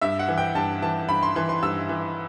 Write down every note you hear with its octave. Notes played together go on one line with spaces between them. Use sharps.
G2 E5
F#5
E3
G5
G2 A5
E3 A5
G2 B5
C6
E3 C6
C6
G2 E6
E3